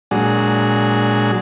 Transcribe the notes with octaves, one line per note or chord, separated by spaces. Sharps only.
A#2 F#3 G#3 D4 F#4 G#4